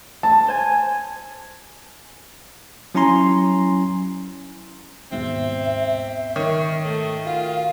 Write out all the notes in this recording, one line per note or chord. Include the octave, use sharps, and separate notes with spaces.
A5
C5 G#5
F#3 C#4 E4 G#5 A#5 C6
D#2 G#2 B2 C4 E5
D#3 C#5
A3
F4 F#4 F5